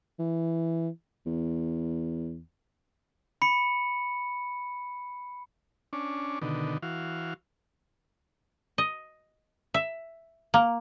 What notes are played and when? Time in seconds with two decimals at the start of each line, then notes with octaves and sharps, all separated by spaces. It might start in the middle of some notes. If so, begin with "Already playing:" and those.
0.19 E3
1.26 E2
3.42 B5 C#7
5.93 C#4 D4
6.42 B2 D3 D#3
6.82 E3 F#4 F5
8.78 D#5
9.74 E5
10.54 A#3